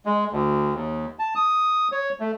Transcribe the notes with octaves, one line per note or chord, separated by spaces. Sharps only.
G#3
D2
D#2
A5
D#6
C#5
A3